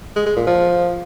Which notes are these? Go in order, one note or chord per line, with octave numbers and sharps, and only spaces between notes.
G#3
G#3
A#2
F3